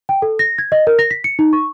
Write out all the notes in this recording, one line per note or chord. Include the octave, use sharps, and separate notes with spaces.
G5
A4
A#6
G#6
D#5
A#4
A#6
B6
C#7
D#4
C#6